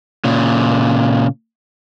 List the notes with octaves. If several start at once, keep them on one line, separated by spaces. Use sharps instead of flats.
A#2 C#3